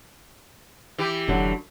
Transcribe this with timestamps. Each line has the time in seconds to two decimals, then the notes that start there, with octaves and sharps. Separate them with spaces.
0.98 E3 G4
1.28 F1 D3 F#3